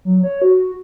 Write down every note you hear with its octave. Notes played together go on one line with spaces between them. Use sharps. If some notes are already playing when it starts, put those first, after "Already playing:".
F#3
C#5
F#4